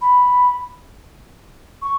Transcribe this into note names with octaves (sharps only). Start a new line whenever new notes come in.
B5
C#6